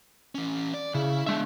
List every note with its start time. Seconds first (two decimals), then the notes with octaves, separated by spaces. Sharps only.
0.35 E3 C#4
0.74 D5
0.94 C#3 E4
1.27 G#3 D4 E5